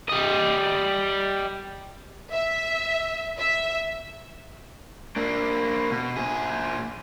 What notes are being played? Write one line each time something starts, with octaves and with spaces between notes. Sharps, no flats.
G3 D#5
E5
E5
A#3 D4
B2
A#2 G#4